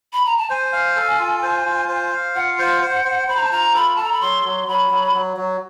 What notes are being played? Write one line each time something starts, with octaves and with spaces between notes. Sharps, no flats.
B5
A#5
A5
C5 G#5
F5
A4
F4
C5
F4
C5
F5
F4 F#5
C5
C5
C5
C5 B5
A#5
A5
F4 A#5
A4 B5
A4 A5
A#5
B5
F#3 C6
F#3
F#3 B5
F#3
F#3
F#3